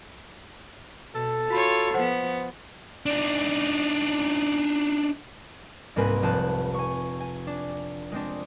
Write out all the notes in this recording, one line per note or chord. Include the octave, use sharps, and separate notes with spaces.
B2 A4
F4 F#4 C#5 B5
F3 B3 C5 F#5
D4 D#4
C2 G#2 A#3 C4 B4 G#5
F1 A5 F#6
G#5 C#6
G#5
D4
G#3 C4 D4